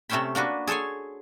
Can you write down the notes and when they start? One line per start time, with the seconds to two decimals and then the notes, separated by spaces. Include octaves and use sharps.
0.09 C3 A3 C4 C#4 C5 B5
0.35 A#3 D4 F#4 B4
0.67 G#4 A4 C5 C#5 G#5